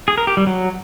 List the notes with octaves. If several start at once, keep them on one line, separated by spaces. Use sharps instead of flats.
G#4
A#4
G4
G3
F#3